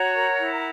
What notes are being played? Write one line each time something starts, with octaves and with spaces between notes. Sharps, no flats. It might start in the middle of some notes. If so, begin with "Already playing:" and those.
Already playing: F#4 C#5 F#5 A#5
A#4
E4